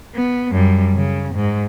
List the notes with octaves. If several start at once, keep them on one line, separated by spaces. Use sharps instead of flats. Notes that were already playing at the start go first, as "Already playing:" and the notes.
B3
F#2 G3
C#3
G#2